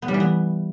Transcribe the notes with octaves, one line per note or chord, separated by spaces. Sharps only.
B3
G3
E3
B3